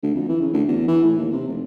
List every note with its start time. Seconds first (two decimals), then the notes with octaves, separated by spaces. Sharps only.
0.03 D2
0.14 F2
0.29 E3
0.41 C#3
0.53 D2
0.68 E2
0.88 E3
1.04 A2
1.18 D#2
1.32 C3
1.47 F1